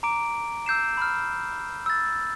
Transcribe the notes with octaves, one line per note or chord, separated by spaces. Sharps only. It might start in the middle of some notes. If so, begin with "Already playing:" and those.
A#5 D6 D7
E6 G6 C7 E7
B5 F6
E6 A6